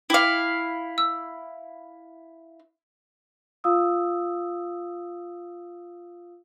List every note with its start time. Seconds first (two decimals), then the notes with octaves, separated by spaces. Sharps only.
0.10 E4 F5 G5 D6
0.98 E6
3.64 F4 F5 D#6 E6